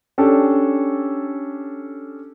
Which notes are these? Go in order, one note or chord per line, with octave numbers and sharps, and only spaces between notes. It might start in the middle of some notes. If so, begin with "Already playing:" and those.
C#4 D4 G4 A4